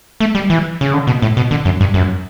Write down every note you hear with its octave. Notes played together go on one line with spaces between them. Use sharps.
A3
G3
E3
C#3
D3
B2
A2
B2
D3
F#2
G2
F#2